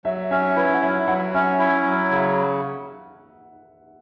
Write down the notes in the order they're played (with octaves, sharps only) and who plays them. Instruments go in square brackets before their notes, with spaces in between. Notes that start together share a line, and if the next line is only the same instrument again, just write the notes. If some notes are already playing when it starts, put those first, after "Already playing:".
[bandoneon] F#3 [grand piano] E5
[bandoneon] C#4 [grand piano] E5
[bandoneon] E4 [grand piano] B4
[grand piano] F#5
[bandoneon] F#3 [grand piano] E5
[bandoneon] F#3 [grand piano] F#5
[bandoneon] C#4 [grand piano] E5
[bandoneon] E4
F#3
C#3